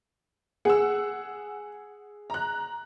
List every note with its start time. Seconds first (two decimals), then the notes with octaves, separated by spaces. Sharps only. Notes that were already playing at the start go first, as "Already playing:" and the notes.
0.65 G#4 F#5 E6
2.30 A#5 F#6